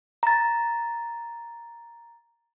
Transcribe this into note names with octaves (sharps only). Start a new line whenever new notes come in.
A#5 A6